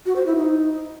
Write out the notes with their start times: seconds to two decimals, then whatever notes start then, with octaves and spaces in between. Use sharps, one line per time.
0.06 F#4
0.16 C5
0.26 E4
0.36 D#4